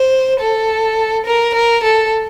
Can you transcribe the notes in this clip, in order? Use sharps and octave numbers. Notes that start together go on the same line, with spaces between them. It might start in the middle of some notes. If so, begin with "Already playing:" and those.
Already playing: C5
A4
A#4
A#4
A4